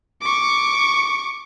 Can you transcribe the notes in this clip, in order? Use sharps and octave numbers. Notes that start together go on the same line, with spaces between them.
C#6 D6